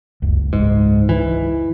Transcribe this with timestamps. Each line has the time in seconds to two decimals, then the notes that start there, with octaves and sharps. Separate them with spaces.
0.22 F#1 C#2
0.53 G#2
1.09 E3